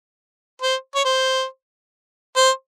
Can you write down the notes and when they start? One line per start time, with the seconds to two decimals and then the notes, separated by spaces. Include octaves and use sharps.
0.62 C5
0.95 C#5
1.05 C5
2.36 C5